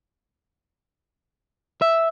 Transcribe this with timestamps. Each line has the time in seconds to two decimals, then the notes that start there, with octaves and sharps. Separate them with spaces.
1.82 E5